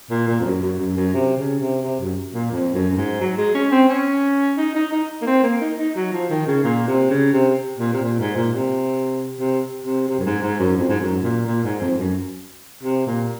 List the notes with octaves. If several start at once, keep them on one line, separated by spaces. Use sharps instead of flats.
A#2
A#2
F2
F#2
F#2
F#2
F#2
C3
C#3
C3
C3
F#2
A#2
F2
F#2
F#2
G#2
F#3
G#3
C#4
C4
C#4
D#4
D#4
D#4
A#3
C4
A#3
D#4
D#4
F#3
F3
D#3
C#3
A#2
C3
C#3
C3
A#2
C3
A#2
G#2
A#2
C3
C3
C3
C3
F#2
G#2
G#2
F#2
F2
G#2
F#2
A#2
A#2
G#2
F2
F#2
C3
A#2